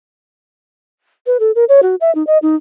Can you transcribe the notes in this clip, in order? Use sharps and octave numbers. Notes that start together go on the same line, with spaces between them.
B4
A4
A#4
C#5
F#4
E5
D#4
D#5
D#4